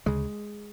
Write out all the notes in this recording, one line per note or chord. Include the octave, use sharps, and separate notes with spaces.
D2 C#3 G#3